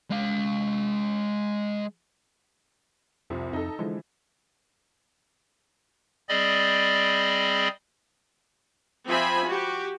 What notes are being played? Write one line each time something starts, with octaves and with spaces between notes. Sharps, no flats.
G#3 F5
C2 F2 C3 F3
F2 D#4 A4
D3 E3 F3 G#3
G3 C4 G#4 D5 D#5 B5
F3 C4 E5 G#5 B5
F#4 G4